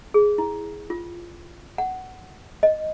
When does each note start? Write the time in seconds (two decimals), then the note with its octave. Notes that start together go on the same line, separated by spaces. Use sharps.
0.14 G#4
0.38 E4
0.90 F4
1.78 F#5
2.63 D#5